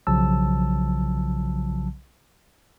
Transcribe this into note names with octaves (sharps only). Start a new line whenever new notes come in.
B1 C#3 F3 F#3 A5 E6